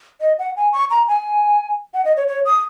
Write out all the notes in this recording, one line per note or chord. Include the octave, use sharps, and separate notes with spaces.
D#5
F#5
G#5
C#6
A#5
G#5
F#5
D#5
C#5
C#5
D#6